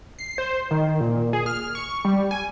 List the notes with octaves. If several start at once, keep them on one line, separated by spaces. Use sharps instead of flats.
C7
C5
D#3
A#2
G#4
F6
C#6
G3
G#5